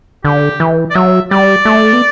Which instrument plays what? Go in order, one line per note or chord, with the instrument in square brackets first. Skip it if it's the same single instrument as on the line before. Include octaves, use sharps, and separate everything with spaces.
[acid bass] D3 [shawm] G4
[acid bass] E3
[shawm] D5
[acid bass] F#3 [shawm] E5
[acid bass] G3 [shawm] D5
[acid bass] A3
B3